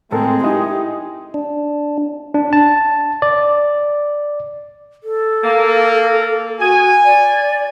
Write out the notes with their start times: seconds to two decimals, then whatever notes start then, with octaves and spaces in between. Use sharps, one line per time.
0.12 A2 G#3 C4 A4 A#4
0.44 D#4 E4 G4 D#6
1.34 D4
2.34 D4
2.53 A5
3.22 D5
5.04 A4
5.43 A#3
6.60 F#4 G#5
7.05 D5